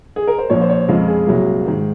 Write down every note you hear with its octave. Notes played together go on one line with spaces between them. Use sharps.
G#4
A#4
C5
A#1 A#2 F3 C#5
C5
C#5
F2 C#3 G#3
G#4
C2 A#2 F#3
G#2 D#3